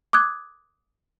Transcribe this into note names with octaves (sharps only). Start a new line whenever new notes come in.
D6 D#6 F#6 G#6